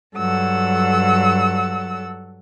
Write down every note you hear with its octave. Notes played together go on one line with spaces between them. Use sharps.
G2 F#3 A4 F#5 E6